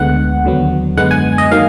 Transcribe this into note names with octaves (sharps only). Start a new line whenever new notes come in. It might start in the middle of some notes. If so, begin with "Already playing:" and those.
Already playing: D2 D3 G#3 B3 F#5
D#2 D3 F#3 B3
F#2 D3 G#3 B3 F#5
G#5
D#5
D#3 F#3 A#3 F5